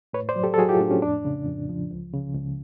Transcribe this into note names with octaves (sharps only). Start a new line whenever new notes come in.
A2 B4 C#5
C5 D5
F#3
G4 A4
A4
F#3 F#4 G#4
F4 G4
A2 D4
C#4
F2 D4
C#3
F2
F3
C#2
C#3
C#2